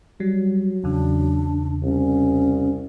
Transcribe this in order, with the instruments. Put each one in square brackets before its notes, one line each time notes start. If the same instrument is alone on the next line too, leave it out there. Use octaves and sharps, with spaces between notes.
[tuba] F#3 [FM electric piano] G3
[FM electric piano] E2 C#3 [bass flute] D4
[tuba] C2 [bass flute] C#4